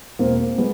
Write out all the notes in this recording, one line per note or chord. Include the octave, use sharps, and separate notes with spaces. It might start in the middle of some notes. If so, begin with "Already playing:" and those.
E1 A#3 C4
G#3 B3